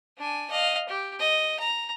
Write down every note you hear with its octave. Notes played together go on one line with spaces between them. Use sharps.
D4 G#5
D#5 F5
G4
D#5
A#5